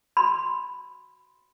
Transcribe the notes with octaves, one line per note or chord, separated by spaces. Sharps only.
B5 C6